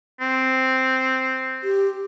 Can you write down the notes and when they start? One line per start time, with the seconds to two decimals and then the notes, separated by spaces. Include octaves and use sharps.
0.20 C4
1.64 G4